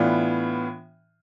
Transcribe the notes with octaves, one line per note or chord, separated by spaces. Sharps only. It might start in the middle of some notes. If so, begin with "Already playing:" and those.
Already playing: A2 E3 B3 D4 F4